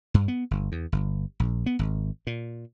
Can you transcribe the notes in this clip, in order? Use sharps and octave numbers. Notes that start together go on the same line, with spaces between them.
G2
B3
G1
E2
G1
A#1
B3
G#1
A#2